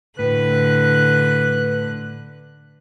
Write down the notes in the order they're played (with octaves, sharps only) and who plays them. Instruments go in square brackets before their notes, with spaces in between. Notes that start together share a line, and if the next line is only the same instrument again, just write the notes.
[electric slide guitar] A2 [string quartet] D3 F#6 [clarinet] B4